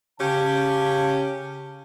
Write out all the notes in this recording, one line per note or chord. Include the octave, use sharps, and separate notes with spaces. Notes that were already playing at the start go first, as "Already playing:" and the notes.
C#3 C#4 G4 F5 A5